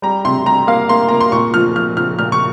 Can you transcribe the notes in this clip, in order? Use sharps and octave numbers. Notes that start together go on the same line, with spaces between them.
G3 A#5
C3 C6
G3 A#5
A#3 F5
A#3 C6
A#3 A#5
C6
A#2 C#6
F3 F6
F3 F6
F3 F6
A#2 F6
C#6